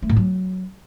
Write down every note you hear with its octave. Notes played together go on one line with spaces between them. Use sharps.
A3
A2
F#3